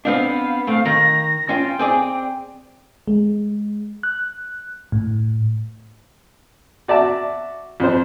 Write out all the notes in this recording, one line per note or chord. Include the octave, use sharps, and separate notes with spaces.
B3 C4 D4 F5
A3 C4 F5
D#3 A#6
C#4 F4 G5
C4 G#4 D5
G#3
F#6
A2
F#4 D5 E5 A5
F2 C5